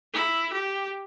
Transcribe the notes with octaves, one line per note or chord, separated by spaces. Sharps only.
E4
G4